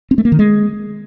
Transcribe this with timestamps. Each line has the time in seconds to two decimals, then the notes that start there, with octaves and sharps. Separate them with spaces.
0.11 C4
0.18 A3
0.25 A#3
0.32 D#3
0.39 G#3